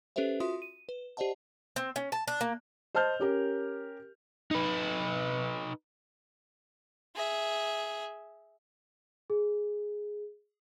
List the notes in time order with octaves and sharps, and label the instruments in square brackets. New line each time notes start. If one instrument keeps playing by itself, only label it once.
[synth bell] C#4 G4 A4 B4 C5 E5
F4 F#4 E5 C6 D#6
D#7
B4
G4 C5 D5 D#5 F#5 A5
[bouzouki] C4
C#4
A5
D4
A#3
[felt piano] C5 D#5 A5 F6 G6
C#4 G4 A#4
[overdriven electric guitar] D#4 B4
[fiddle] G#4 E5
[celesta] G#4